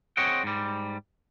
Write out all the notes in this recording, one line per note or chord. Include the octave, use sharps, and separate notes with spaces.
C4 G#4 C#5 D#5 F#5 G5
G#2 G3